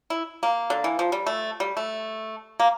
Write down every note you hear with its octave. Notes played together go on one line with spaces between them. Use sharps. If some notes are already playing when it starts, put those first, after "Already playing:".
E4
A#3
D3
E3
F3
G3
A3
G3
A3
A#3